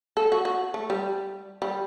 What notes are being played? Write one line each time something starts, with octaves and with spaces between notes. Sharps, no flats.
A4
F#4
F#4
A3
G3
G3